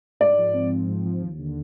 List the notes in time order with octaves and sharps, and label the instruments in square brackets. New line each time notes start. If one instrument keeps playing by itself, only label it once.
[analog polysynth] G#2 [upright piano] D5
[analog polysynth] F3
C4
F3
G#2
F3
D#2
D3